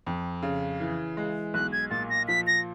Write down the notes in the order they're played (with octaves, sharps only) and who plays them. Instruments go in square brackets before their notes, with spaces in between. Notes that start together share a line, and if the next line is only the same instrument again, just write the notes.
[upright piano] F2
C#3
E3
G#3
[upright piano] B1 [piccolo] F#6
[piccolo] G#6
[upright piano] A#2 [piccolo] A6
[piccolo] A#6
[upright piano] F3 [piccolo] B6
[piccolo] A#6